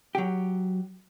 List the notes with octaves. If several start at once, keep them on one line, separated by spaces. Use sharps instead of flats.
F#3 G4